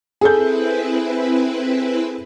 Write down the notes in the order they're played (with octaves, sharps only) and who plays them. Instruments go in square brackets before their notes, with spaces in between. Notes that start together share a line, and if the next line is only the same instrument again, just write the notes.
[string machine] C4 E4 B4 [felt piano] G#4 A4 G6